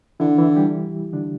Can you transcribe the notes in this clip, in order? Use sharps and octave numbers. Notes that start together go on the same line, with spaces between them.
D3 E3 E4
E3 E4
G3 G4
D3 D4